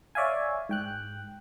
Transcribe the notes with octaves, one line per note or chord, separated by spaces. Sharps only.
C#5 D5 E5 F5 G#5
G#2 G5 F#6